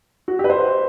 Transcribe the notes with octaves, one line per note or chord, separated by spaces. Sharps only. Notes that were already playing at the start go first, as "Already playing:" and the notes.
F#4
G4
B4
C5